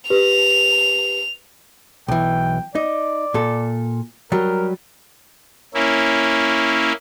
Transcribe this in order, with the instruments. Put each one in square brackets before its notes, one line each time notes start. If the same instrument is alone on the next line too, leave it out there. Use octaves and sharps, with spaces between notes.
[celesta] G4 B4 [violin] F7
[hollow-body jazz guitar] B1 E3 [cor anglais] G5
[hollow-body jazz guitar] D#4 [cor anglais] D5
[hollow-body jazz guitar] A#2 A4
[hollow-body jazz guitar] F#3 G3 [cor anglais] A#4
[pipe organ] A#3 C#4 E4